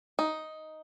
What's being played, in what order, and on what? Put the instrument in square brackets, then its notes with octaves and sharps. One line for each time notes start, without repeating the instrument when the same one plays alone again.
[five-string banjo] D#4